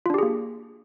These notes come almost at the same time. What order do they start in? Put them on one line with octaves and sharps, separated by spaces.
F4 D4 G4 G#4 A#3